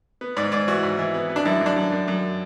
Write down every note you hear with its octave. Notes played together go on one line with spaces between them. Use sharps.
B3
G#2 D5
G#2 D5
E3 F#4
G#2
E3
B3
B3
D4
F#2 E4
F#2
D4
F#2
F#2
F#2